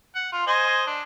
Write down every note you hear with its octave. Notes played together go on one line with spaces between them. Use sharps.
F#5
F4
C5 D#5 G#5
D4